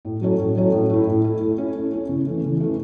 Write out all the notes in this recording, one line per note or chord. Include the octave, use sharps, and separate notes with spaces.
A2
F#3 C#4 A4 C#5
A2
F#3 C#4 A4 C#5
A2
A3 E4
A2
A3 E4
A3
C#4 E4
A3
C#4 E4
C#3
E3 A3
C#3
E3 A3